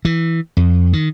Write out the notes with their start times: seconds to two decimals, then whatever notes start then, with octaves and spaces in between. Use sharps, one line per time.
0.05 E3
0.57 F2
0.93 D#3